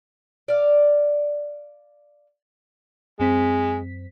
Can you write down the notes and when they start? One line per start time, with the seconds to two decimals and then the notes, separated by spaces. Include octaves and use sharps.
0.48 D5 F5
3.20 F#2 G#3 C4 B6